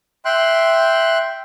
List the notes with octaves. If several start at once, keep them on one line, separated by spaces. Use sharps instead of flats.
E5 G5 C6 F#6